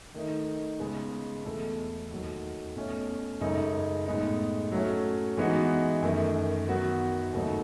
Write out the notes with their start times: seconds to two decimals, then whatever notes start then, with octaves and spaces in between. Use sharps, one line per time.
0.14 D#3 A3 D#4
0.79 C#3 G#3 B3
1.45 E2 B2 A3 E4 A4
2.10 D#2 D#3 F#3 A3
2.76 B2 A3 C#4
3.41 F#2 C#3 G#3 D#4 A4
4.06 A2 G#3 B3 D#4
4.72 F#3 A3 C#4
5.37 E3 G#3 B3 D#4 F#4
6.03 F#2 D#3 A3
6.68 D#3 F#3 B3 F#4
7.33 D#2 C#3 F#3 A3 D#4